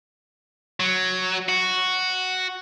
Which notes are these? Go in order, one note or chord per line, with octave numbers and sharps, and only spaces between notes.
F#3
F#4